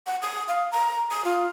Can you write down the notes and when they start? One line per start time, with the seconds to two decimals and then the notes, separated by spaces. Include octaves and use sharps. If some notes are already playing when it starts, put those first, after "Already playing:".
0.07 F#5
0.22 D#6
0.48 F5
0.72 A#5
1.11 D#6
1.25 F4